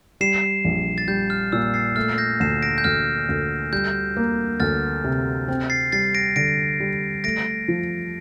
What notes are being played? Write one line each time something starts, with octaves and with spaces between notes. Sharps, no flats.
G3 C7 E7
A#1
A6
G3 G6
F6
A#2 E6
A6 C7
A3 F6 A6
G6 A#6
D2 C7 E7
A#6 D7
G6
D2 F6
D2
G3 G6
A#3
D2 F6 A6
C3
C4
A6 C7
G3 A6 C7
A#6 D7
D3 A#6 D7
G3
A3 A#6 D7
F3